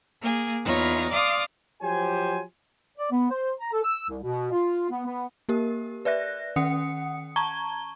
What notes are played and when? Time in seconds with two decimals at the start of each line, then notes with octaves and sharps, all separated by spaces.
0.21 A#3 G#4
0.64 E2 D#4 F4 C#5 A#6
1.11 D5 F5 C6 D6 D#6
1.82 F3 F#3 G4 C5 G#5
2.98 D5
3.11 B3
3.31 C5
3.60 A#5
3.72 A4
3.84 E6
4.09 C2
4.23 B2
4.52 F4
4.90 B3
5.05 B3
5.49 A#3 G4 A#4
6.05 B4 D5 E5 F#6 A#6
6.56 D#3 C#4 F#5 D#6 C#7
7.36 A5 A#5 C#6 G#6 G7